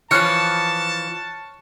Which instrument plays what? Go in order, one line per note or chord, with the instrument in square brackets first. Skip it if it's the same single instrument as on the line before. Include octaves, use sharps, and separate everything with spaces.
[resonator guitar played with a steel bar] E3 F3 [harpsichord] C#5 [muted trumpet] A5 [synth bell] F6 F#6 C#7